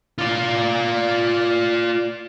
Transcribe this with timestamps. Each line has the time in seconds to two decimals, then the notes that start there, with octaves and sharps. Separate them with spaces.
0.18 F4 D5